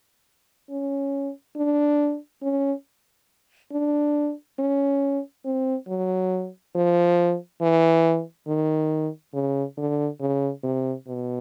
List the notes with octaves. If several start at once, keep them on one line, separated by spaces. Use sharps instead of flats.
C#4
D4
C#4
D4
C#4
C4
F#3
F3
E3
D#3
C#3
D3
C#3
C3
B2